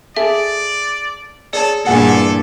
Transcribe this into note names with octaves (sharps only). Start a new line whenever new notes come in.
G#4 A4 D5 E5
G#4 A4 C#5 D5 A5
E2 G2 A#2 G#4 A4 F#5 G#5